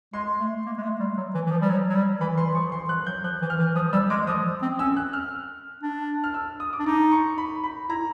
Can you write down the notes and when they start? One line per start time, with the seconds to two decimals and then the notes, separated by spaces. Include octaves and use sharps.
0.13 G#3 C6
0.39 A3
0.66 A#3
0.77 G#3
0.83 A3
1.00 G3
1.17 F#3
1.34 E3
1.46 E3
1.51 F3
1.62 G3
1.69 F#3
1.89 F#3
1.95 G3
2.21 E3 B5
2.37 E3 C6
2.55 F3 C#6
2.72 E3 C6
2.89 F3 F#6
3.06 F#3 G6
3.24 F3 F#6
3.41 E3
3.50 F6
3.59 E3
3.76 F3 D#6
3.93 G3 E6
4.10 G#3 D6
4.27 F3 D#6
4.62 C4
4.79 C#4 E6
4.97 F#6
5.13 F6
5.83 D4
6.24 F6
6.34 E6
6.60 D#6
6.73 D6
6.80 D4
6.86 D#4 D6
7.12 C#6
7.38 B5
7.64 B5
7.89 E4 A#5